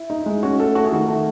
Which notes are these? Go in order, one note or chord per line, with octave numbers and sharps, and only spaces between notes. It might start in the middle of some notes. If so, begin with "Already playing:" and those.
Already playing: E4
D#4
G#3
C#4 F#4
A3 A4
A3 F#4
G#4
D#3 F#4
A3